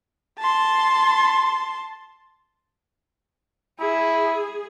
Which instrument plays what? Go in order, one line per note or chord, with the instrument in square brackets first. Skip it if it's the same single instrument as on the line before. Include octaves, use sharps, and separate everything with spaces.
[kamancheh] A5 C6
[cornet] E4 [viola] G#4